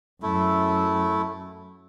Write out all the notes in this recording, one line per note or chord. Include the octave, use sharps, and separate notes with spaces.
F#2 A3 E4